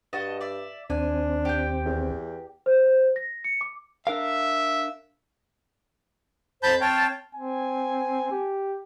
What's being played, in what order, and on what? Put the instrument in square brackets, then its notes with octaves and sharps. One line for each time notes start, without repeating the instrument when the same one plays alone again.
[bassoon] G2 [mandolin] F#4 D#5 A5
[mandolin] D5 E5
[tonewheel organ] D#2 C4 [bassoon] D4 [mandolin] G#5
[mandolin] G4 G5
[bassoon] E2
[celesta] C5
C5
A#6
C#7
D6
[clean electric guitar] D4 A#4 F5 [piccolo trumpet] E5
[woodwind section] F2 C5 [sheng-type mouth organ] A5 B5 G6
[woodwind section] C4 F5 A5 [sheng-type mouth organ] C#5 G5
[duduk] C4 [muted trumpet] G#5
[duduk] G4